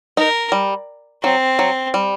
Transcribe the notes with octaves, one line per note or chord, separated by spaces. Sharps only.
D#4 A#4
G3
F#3 C4
F#3
G3